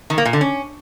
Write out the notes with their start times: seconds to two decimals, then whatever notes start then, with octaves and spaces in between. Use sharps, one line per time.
0.10 D#3
0.18 A#3
0.25 A#2
0.33 D3
0.41 C#4